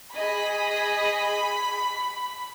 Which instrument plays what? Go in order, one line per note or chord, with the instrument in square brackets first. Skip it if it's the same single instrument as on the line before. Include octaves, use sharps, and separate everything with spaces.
[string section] G#4 D#5 [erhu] B5